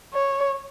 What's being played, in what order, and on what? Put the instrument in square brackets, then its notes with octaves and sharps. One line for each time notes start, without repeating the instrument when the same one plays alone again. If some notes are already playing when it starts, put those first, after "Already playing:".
[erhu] C#5